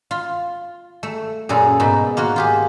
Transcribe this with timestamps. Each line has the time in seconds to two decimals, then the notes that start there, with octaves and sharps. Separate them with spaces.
0.11 F4
1.03 A3
1.49 F#2 A#2 G#4 A4 A#5
1.80 G#2 B2 D#4 B5
2.17 A#3 F4 F#4
2.36 F4 G4 G#4